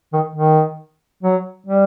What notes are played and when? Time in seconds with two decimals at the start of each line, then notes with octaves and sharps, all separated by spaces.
0.13 D#3
0.36 D#3
1.23 F#3
1.66 G3